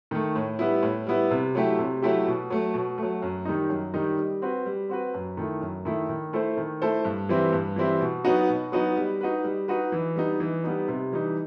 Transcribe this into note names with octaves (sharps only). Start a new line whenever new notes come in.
D#3 A3
A2
G3 B3 E4
A2
G3 B3 E4
C3
F#3 A3 E4 G4
C3
F#3 A3 E4 G4
B2
F#3 A3
B2
F#3 A3
F#2
D#3 G3 D#4
F#2
D#3 G3 D#4
G3
C4 F#4 B4
G3
C4 F#4 B4
F#2
D#3 A3 E4
F#2
D#3 A3 E4
D#3
A3 E4 A4 C5
D#3
A3 E4 A4 C5
G2
E3 G3 C4 E4
G2
E3 G3 C4 E4
B2
F#3 B3 D#4 F#4
B2
F#3 B3 D#4 F#4
G3
D#4 F#4 B4
G3
D#4 F#4 B4
E3
G3 B3 D#4
E3
G3 B3 D#4
C3
E3 G3 D#4